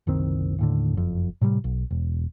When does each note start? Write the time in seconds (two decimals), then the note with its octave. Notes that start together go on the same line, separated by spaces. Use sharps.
0.07 F#1 C2 D#3 C4
0.59 D#2 A2 D3
0.93 F#1 F2
1.41 A2 C3 F3 G3
1.64 B1
1.91 E1